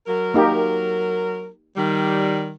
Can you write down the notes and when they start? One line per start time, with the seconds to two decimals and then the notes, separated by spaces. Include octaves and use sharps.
0.07 F#3 A#4
0.34 A#3 D#4 G4
1.76 D#3 G3